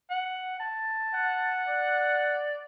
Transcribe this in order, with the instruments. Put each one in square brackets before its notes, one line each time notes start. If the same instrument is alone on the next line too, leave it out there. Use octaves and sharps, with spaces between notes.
[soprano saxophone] F#5
A5
[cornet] F#5
[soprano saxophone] D5